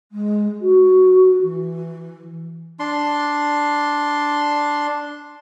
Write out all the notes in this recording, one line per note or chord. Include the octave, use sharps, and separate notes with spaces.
G#3
F#4
E3
D4 C6